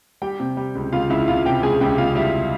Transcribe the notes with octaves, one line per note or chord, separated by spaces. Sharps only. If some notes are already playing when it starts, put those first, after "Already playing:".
G3 G4 G5
C3
G3
C#2
C#2 F4 F5
C#2 E4 E5
C#2 F4 F5
C3 G4 G5
C#2 G#4 G#5
C#2 G4 G5
C#2 F4 F5
G3 E4 E5